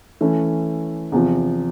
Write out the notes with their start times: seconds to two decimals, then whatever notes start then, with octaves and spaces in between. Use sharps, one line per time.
0.21 E3 A3 C#4
1.12 E2 C3 F3